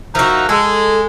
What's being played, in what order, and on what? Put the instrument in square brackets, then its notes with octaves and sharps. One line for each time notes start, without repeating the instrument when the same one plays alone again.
[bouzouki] F3 F#4 [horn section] D#4 A#4 E5
[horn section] G#3 [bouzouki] A4